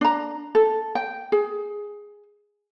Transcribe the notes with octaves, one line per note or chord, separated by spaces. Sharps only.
D4 A#5
A4
G5
G#4